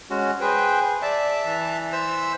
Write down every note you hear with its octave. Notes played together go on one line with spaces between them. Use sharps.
G#3 C#4 F#4
G#4 B4 C5 G5
D5 E5 A5
E3
C5 E5 E6